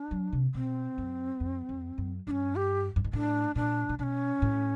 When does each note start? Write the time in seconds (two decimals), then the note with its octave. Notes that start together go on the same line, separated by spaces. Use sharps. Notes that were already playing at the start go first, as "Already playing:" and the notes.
Already playing: D4
0.11 F#3
0.33 C3
0.54 B2 C4
0.98 F#2
1.40 F2
1.69 F2
1.98 F#2
2.27 G2 D4
2.31 C#4
2.56 G4
2.96 G2
3.04 G#2
3.13 A2 D4
3.55 A#2 D4
3.89 A#2
3.99 B2 C#4 D4
4.42 A2